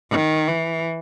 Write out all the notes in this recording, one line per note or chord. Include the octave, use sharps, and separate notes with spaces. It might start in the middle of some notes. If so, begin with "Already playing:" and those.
D#3
E3